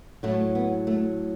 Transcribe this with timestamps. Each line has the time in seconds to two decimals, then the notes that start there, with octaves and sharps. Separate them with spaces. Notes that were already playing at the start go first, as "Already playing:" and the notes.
0.23 A2 F#3 A3
0.55 B3
0.87 A3